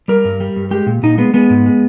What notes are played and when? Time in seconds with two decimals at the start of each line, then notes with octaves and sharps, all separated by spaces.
0.08 G3 A#4
0.25 G2
0.40 G3
0.56 G2
0.71 G#3 G4
0.87 A#2
1.03 A#2 D#4
1.18 G#3 B3
1.34 G#3 B3
1.50 G#2
1.66 G#3